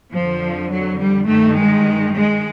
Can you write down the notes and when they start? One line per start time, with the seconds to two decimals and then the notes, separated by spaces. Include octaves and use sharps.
0.12 F2 D3 F3
0.70 F#3
0.97 G3
1.26 G2 D#3 A3
1.54 G#3
2.11 G#3